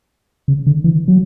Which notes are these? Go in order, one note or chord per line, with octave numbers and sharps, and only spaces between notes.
C#3
D3
E3
F#3